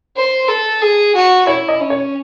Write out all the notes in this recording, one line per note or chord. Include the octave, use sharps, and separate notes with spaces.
C5
A4
G#4
F#4
E4 C#5
D#5
C#4
C#5